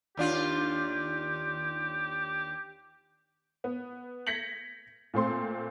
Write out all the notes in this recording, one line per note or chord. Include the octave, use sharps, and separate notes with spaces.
D#2 D4 F4 G4
B3
G6 G#6 A#6 B6 C#7 F#7
A#2 A3 C4 C6